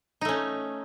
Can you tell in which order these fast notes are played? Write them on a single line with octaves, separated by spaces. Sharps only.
D#4 A3 C#4